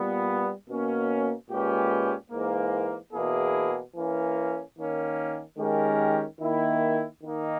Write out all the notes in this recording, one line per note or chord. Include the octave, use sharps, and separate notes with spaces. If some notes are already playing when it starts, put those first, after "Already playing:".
Already playing: A#2 G3 B3
B2 A#3 C#4
A#2 G#3 C#4 G4 B4
G#2 E3 A#3
E2 B2 A#3 E4 G#4
E3 A#3 C#4
D#3 A#3 C#4
D#3 G#3 C#4 G4 A#4
D#3 A#3 E4
D#3 A#3 D#4